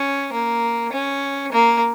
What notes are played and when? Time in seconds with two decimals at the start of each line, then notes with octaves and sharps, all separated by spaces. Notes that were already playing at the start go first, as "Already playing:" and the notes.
Already playing: C#4
0.33 A#3
0.92 C#4
1.52 A#3